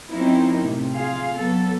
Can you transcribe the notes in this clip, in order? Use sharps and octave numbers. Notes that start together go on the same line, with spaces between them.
F3 C4 C#4 D#4 E4 A#4
A2 C3
F4 G#4 F5
F#3 B3 A4